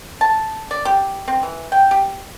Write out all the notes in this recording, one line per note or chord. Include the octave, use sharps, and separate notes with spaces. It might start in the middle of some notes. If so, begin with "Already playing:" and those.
A5
D5
G4
C4
E3
G5
G4